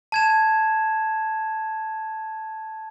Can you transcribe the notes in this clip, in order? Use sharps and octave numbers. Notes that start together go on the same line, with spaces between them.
A5 G#6 E7